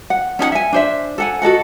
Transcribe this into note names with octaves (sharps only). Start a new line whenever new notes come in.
F#5
C#4 D#4 G#4 F#5
E5 G#5
D4 C5 E5
A4 F#5 G#5
F#4 A4 D#5 F#5